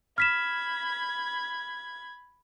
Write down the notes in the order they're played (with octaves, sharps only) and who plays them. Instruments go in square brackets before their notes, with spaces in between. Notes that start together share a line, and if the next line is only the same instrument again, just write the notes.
[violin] B5 G#6 [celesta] F6 B6 E7